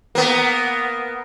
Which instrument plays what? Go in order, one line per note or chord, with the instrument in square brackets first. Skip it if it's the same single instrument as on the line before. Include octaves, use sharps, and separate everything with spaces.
[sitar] A#3 B3